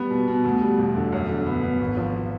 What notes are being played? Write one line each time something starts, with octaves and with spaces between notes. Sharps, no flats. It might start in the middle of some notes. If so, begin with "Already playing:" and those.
Already playing: G3 B3
B2
B2
D2
G3
E1
D3
F#2
D3
B3
B3
G#1
F3